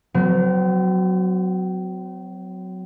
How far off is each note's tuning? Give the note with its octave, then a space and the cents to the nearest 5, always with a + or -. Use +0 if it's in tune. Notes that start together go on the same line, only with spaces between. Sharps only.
F#3 +0 C4 -40